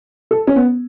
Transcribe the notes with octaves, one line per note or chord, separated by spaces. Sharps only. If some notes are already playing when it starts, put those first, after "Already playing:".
A4
C#4
B3